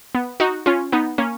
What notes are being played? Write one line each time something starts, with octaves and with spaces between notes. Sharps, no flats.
B3
D#4 F#4
C#4 F4
B3 D#4
A#3 C#4